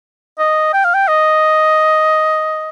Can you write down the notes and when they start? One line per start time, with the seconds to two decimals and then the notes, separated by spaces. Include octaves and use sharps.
0.39 D#5
0.73 G5
0.85 F5
0.94 G5
1.08 D#5